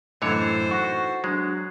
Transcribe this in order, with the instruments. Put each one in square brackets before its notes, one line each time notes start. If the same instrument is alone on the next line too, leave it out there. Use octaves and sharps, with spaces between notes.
[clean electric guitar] F#2 A2 [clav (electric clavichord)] D3 E3 C#5 [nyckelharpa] A4 C5 [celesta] D#5
[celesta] D#4 A#6 [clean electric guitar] F#4
[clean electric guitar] F#3 [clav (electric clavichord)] G#3 [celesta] D4 F#6 C7